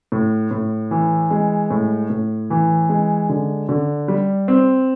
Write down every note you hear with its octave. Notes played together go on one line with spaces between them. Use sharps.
A2
A2
E3
G#3
A2
A2
E3
G#3
D3
D3
G3
C4